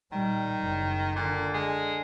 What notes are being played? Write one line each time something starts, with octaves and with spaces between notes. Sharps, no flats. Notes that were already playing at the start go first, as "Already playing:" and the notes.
A#2 D#3 G3
F#1
A#2 D3
G#3